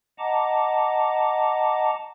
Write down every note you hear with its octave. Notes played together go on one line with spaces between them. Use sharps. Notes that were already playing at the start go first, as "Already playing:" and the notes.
D#5 F#5 A5 A#5 D6